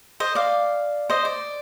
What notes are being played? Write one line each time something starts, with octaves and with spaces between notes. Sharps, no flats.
C5 D#5
D5 F5
C5 D#5
D5